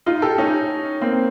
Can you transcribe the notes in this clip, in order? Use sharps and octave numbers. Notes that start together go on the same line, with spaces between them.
D#4 F4
G4 A4
C#4 D#4
A#3 C4